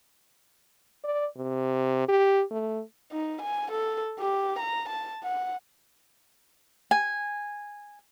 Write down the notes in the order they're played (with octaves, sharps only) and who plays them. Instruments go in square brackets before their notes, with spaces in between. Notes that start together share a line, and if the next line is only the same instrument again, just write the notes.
[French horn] D5
C3
G4
A3
[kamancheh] D#4
G#5
A4
G4
A#5
A5
F#5
[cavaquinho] G#5